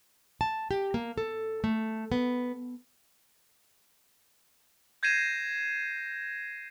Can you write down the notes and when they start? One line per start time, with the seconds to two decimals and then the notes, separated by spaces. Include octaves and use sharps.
0.41 A5
0.71 G4
0.94 A#3
1.18 A4
1.64 A3
2.12 B3
5.03 G6 G#6 A#6 C7 D#7 E7